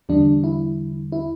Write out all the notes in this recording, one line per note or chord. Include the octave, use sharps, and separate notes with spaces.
E2 D3 G3 D4
E4
E4